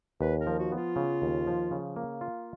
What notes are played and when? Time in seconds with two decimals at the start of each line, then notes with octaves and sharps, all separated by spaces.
0.21 D#2 B4
0.41 A#4
0.47 F3
0.59 F#4
0.72 B3
0.77 F4
0.96 C#3
1.22 D#2
1.47 F3
1.71 C#3
1.96 A#3
2.21 F4